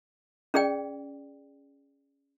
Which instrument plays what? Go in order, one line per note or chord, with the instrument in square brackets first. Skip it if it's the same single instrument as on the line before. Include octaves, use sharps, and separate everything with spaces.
[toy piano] C#4 G#4 D5 G5